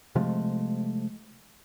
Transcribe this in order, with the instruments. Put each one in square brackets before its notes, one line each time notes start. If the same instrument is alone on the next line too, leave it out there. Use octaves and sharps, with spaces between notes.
[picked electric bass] C3 F3 G#3 A3